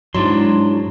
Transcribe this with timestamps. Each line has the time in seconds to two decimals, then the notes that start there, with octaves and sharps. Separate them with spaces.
0.14 G#2 F#3 D4 E4 C6